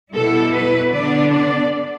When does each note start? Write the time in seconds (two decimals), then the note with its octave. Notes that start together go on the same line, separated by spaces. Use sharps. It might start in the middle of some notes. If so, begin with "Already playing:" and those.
0.13 B2 G3 E4 A4
0.54 B4
0.93 D3 B3 D4 D5
1.34 D5